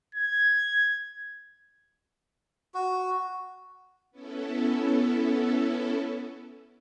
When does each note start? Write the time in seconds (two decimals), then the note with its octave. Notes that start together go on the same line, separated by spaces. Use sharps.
0.15 G#6
2.74 F#4
4.11 B3 C#4 E4 A4